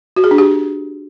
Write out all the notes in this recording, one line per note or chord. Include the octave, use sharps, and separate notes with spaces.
F#4
G#4
D4
G4